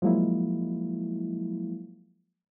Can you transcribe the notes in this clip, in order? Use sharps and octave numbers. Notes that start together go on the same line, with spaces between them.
F3 F#3 G#3 A#3 E4